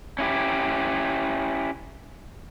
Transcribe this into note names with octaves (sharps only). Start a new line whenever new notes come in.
C#4 E4 G4